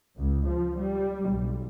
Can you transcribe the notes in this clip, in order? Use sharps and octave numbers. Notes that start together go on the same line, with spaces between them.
C#2
F3
G3
B1